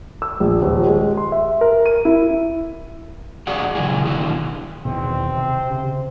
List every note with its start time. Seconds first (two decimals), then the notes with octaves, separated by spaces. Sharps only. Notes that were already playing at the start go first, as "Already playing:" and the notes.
0.22 E6
0.40 A#1
0.62 D#1
0.87 G#3
1.17 C6
1.32 E5
1.61 A#4
1.86 D#7
2.05 E4
3.47 E2 F#4 G#4 D5 F#5
3.75 A#2 C#3 E3 F#3 E4 G#4
4.05 B2 D3 D#3 E4 F#4
4.85 E2 B2 D#3 C4
5.36 C3 C5
5.69 C#3